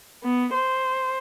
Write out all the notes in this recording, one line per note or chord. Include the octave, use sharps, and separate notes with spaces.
B3
C5